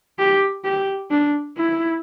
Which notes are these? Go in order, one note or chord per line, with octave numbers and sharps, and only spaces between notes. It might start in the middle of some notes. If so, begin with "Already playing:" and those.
G4
G4
D4
E4